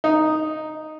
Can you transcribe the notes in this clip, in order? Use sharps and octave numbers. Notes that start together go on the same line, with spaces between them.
D#4